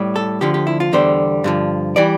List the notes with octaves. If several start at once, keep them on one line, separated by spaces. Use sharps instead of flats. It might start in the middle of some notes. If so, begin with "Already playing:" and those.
Already playing: A2 G3
A4
D2 D3 F3 G4
G4
E4
F4
E2 D3 G3 C5
G2 D3 F3
E3 G3 D5